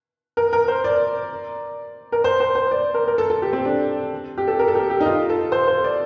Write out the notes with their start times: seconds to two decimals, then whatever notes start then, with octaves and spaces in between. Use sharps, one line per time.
0.37 A#4
0.53 A#4
0.68 C5
0.84 D5
2.12 A#4
2.24 C5
2.40 C5
2.55 C5
2.71 D5
2.94 A#4
3.08 A#4
3.18 A4
3.30 A4
3.42 G4
3.53 C4
3.65 D4
4.38 G4
4.48 A4
4.59 A#4
4.68 A4
4.75 G4
4.90 G4
5.00 D#4
5.06 F4
5.29 A4
5.52 C5
5.67 C5
5.84 D5